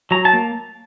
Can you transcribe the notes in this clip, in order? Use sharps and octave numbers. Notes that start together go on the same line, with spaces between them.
F#3 A#5
A5
A#3